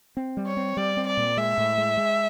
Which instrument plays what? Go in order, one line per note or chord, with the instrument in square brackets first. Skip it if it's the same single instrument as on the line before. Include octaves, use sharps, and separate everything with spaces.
[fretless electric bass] C4
G3
[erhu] C#5
[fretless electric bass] C4
[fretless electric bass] G3 [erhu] D5
[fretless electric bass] C4
[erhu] D5
[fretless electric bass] A#2
[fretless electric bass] G#3 [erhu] E5
[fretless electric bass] A2
G#3
G#3